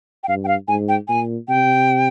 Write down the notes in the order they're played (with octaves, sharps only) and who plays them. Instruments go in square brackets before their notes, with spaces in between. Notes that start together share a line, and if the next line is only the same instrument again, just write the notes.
[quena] G5
[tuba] G2 [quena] F5
[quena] G5
F5
[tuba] G#2 [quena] G#5
[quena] G5
[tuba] A#2 [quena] G#5
[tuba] C3 [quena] G5